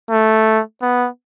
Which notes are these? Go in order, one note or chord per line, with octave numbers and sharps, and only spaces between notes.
A3
B3